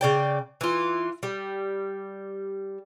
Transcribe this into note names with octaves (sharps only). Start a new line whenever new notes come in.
C#3 D5 G5
E3 F4
G3